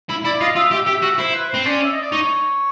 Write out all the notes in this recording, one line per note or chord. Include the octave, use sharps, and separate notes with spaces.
E4
E4 D5
F4 D#5
F4 E5
G4 E5
E5
G4
E5
F#4
E5
E4 C5
B4
C4 C5
C#4 D5
E5
D#5
D5
D#4 C#5